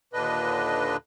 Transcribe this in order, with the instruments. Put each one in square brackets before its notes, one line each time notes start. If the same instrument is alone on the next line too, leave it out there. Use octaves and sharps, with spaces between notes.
[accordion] D#2 A#2 D3 D4 B4 D#5